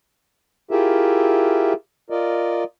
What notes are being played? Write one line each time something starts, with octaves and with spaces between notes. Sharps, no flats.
E4 F4 G4 G#4 A#4 E5
F4 A#4 D5 D#5